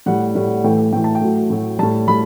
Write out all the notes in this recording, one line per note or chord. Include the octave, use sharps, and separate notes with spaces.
A2 G3 F#5
A2 G3
A2 E3 A3 G5
A2 E3 A3 G5
A5
G5
A2 F#3 A3
A2 F#3 A3
A2 G3 A5
A2 G3 B5